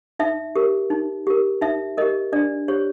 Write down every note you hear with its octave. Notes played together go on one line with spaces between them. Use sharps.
D#4 E5
G4 A#4
D#4
G4 A#4
D#4 E5
G4 A#4 D#5
D4 D5
G4 C5 C#5